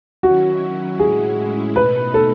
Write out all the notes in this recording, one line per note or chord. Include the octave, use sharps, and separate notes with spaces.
D#3 F#3 C#4 E4 F#4
A2 G#3 C#4 E4 G#4
B2 A3 D#4 B4
A4